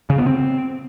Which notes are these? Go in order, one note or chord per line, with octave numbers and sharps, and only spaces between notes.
C#3
B3
C4